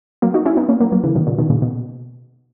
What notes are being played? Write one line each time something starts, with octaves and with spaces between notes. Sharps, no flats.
F#3 A#3
D#4 F#4
C#4 E4
B3 D#4
A#3 C#4
F#3 A#3
F#3 A#3
C#3 E3
B2 D#3
A#2 C#3
B2 D#3
A#2 C#3
B2